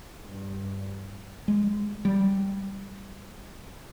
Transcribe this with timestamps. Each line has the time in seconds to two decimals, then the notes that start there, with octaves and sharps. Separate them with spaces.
0.23 G2
1.48 G#3
2.05 G3